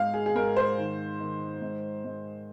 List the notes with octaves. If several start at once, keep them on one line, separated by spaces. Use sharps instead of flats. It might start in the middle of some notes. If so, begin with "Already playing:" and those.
Already playing: G#2 F5
G#4
G#4
G#2 A#4
C5
D#3
D#3
G#2
G#2